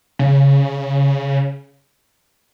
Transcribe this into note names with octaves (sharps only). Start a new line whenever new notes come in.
C#3